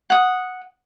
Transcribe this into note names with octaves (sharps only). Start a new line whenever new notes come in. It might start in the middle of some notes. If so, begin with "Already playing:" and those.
F#5 D#6